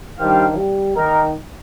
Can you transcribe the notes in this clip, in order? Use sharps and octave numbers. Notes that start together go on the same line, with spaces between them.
D#3 G3 D4 G4 C5 F5
G3
D#3 A#3 D#4 A#4